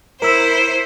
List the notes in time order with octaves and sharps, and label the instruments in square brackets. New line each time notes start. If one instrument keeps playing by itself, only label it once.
[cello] E4 [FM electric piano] A#4 E6 [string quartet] C5